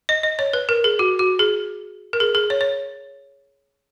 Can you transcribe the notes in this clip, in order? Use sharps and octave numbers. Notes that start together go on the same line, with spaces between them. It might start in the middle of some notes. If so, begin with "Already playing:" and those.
D#5
D#5
C#5
B4
A#4
G#4
F#4
F#4
G#4
A#4
G#4
G#4
C#5
C#5